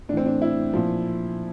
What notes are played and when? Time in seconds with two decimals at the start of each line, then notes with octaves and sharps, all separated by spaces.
0.09 A2 D4
0.13 E3 C4
0.26 D4
0.42 E4
0.73 A#2 F3